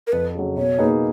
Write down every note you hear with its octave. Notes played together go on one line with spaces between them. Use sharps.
A#4
F2 B4
C#3 F#3
B2 C#5
A#3 D#4 G#4 B4